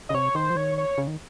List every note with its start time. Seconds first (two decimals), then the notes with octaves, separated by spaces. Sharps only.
0.09 C#3 D#5
0.14 C3 C#5
0.35 D#3 C5
0.50 F3
0.56 D#3 C#5
0.78 C#5
0.98 C#3
1.07 D#3